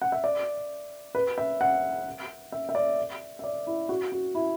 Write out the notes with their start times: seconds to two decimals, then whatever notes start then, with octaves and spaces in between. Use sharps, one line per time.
0.02 F#5
0.12 E5
0.24 D5
1.15 B4
1.38 E5
1.61 F#5
2.52 E5
2.69 E5
2.75 D5
3.39 E5
3.44 D5
3.67 E4
3.89 F#4
4.12 F#4
4.35 E4